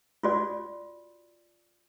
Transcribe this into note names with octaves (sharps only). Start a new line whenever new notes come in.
F4 F#4 D5